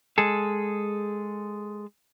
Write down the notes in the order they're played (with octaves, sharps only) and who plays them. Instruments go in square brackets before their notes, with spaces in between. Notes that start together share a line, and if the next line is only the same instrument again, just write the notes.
[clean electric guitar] G#3 G#4 A4